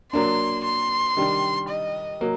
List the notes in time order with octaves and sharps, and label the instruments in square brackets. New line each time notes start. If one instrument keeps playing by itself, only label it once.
[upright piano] F#3 A#3 D4 [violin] C6
[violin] C6
[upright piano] D#3 G3 D4
[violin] D#5
[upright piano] F#3 A#3